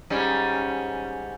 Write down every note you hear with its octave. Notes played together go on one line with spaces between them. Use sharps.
G#2 G3 C#4